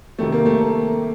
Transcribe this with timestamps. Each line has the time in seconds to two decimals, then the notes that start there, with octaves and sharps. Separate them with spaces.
0.18 C3 D#3 G3 A3
0.32 A#3
0.46 A3
0.60 A3